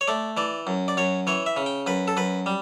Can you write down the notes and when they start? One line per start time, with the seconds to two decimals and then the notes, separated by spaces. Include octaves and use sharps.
0.01 C#5
0.08 A3 D5
0.37 E3 D5
0.67 F#2
0.88 D5
0.97 F#2 C#5
1.27 E3 C#5
1.46 E5
1.57 C#3
1.66 G5
1.87 F#2 B4
2.08 A4
2.17 F#2 B4
2.46 G3